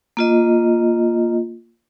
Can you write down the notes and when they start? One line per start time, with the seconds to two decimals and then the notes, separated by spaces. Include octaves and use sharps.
0.17 A#3 F4 D#5